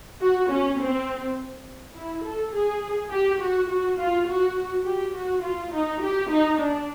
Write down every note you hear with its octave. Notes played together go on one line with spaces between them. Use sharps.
F#4
C#4
C4
E4
A4
G#4
G4
F#4
F#4
F4
F#4
G4
F#4
F4
D#4
G4
D#4
D4